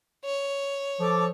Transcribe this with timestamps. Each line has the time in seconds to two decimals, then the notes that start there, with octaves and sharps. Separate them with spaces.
0.25 C#5
1.00 F3 A4 D6